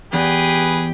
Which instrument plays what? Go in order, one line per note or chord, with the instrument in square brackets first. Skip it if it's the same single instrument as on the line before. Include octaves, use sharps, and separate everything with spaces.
[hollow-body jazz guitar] E2 [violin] G4 [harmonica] G#4 B4